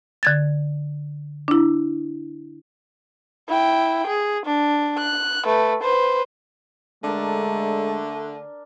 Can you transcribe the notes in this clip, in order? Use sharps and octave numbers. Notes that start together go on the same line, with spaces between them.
D3 G#6 A6
D4 E4
E4 G5
G#4
D4
F#6
A3 B4
B4 C5
D3 G#3 A3 D4 A#4